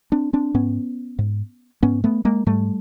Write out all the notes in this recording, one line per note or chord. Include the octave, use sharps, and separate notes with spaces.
C4 D4
C4 D4
G#2 B3 C#4
G#2
G#2 B3 C#4
A3 B3
G#3 A#3
G#2 G3 A3